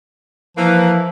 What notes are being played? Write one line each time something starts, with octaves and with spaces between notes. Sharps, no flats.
E3 F3 A#3 B4